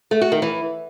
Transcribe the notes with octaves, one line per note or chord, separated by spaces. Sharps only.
A3
F#4
D#3
E3